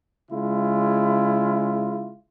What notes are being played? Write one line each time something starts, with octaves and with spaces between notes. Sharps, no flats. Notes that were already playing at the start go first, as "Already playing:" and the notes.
C#3 G#3 E4 F4